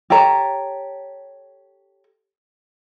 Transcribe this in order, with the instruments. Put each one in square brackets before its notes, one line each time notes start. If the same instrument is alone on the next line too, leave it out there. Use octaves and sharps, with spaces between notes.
[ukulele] G4 A4 C#5 A#5